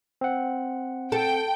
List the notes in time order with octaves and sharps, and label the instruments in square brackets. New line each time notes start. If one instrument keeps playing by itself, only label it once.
[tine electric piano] C4 F#5
[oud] A4 [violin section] G5